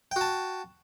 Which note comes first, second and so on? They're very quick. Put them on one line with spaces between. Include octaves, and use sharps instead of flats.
G5 F#4 A5